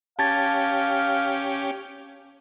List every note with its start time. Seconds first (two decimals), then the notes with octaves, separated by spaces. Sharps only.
0.19 C#4 G4 F5 A5 G#6 A6